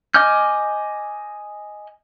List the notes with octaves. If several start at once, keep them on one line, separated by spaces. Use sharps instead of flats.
D#5 G#5 D6 F6 G6